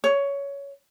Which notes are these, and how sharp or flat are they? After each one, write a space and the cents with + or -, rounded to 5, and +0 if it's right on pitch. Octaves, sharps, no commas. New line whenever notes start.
C#5 +15